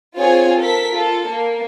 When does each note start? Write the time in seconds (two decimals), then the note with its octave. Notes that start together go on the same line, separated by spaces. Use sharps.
0.17 C4 F4 G#4 C#5 G#5
0.59 A4 A#4 B6
0.93 F4 A4
1.29 A#3